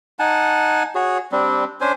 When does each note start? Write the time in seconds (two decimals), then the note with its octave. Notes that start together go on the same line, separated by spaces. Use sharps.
0.19 D#4 F#5 G#5 A5
0.95 F#4 G#4 C#5
1.32 G3 C4 D4
1.81 C#4 D4 C5 G#5